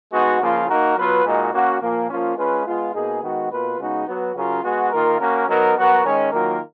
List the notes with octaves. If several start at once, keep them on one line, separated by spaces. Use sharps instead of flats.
G#3 B3 D#4 F#4
C#3 F3 A#3 F4
A#3 D#4 F#4 A#4
F#3 B3 F4 B4
A#2 G#3 D#4 F#4 A#4
A#3 C#4 F#4
A#2 F3 A#3
F3 A#3 C#4 F4
G#3 C#4 F4 B4
G#3 B3 F4
B2 A#3 D#4 G#4
D#3 G#3 B3 F#4
B2 A#3 F4 B4
C#3 G#3 B3 D#4 F#4
F#3 B3 F#4 B4
C#3 F#3 C#4 F4 A#4
G#3 B3 F#4
D#3 A#3 F4 A#4
A#3 C#4 F#4 A#4
F#3 B3 D#4 A#4
F#3 B3 F#4 A#4
D#3 G#3 C#4
D#3 F#3 A#3 F4 A#4